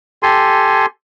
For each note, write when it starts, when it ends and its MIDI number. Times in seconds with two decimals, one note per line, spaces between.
0.23 0.86 67
0.23 0.86 69
0.23 0.86 80
0.23 0.86 84